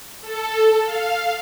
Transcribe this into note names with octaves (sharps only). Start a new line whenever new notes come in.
A4
F5